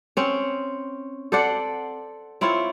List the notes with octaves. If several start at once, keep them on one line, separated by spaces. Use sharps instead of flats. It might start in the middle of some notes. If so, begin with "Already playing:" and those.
C4 C#4
A4 C5 D5 F#5
C4 E4 F4 C#5